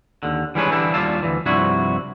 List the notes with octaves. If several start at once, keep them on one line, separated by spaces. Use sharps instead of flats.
D#2 D3
E3 G3 G#3 C#4 D4 B4
D3 E3 G3 D4 E4
D#2 G3 F4 D5 F5 A5
D2 G#2 E3
C2 G2 F3 D4 E4 F#4